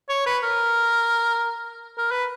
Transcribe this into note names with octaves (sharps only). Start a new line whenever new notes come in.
C#5
B4
A#4
A#4
B4